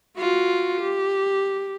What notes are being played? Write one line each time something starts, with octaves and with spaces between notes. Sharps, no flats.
F4 F#4
G4